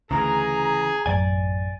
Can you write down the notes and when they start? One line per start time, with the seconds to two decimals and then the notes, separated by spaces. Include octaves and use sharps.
0.11 D2 C#3 E3 G#4 A#5
1.06 A1 F#2 F#3 D5 G#5